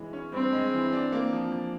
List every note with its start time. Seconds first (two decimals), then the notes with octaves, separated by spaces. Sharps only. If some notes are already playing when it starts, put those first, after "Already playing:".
Already playing: E3 F#3 G#3
0.13 C#4
0.32 G2 C4
0.53 G#3
0.73 E3
0.93 D4
1.12 A#3
1.33 F3
1.52 F3